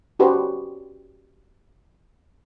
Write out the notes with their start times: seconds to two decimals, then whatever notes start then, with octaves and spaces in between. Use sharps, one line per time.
0.19 C#4 F#4 G4 B4 C5